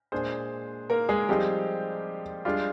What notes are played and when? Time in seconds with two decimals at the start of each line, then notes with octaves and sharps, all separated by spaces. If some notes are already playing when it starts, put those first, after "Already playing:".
0.12 A#2 G#3 D4 G#4 C5
0.90 A#3 A#4
1.09 G#3 G#4
1.29 F3 G3 C4 D#4 G4 G#4
2.45 G3 G#3 D4 F4 G4